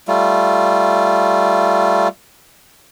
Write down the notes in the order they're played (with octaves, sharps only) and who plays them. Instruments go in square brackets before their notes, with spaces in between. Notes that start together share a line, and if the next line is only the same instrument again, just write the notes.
[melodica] G3 A3 F4